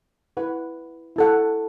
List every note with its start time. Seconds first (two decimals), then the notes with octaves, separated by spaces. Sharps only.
0.37 E4 B4 F#5
1.16 E4 A4 F#5